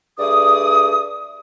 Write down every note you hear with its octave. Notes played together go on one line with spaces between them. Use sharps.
G2 A3 G#4 D5 D#6